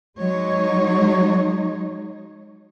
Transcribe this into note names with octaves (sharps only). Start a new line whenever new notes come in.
F#3 G#3 D#4 C#5